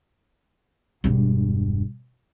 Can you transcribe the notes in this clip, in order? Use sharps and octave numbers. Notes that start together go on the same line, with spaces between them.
E1 G2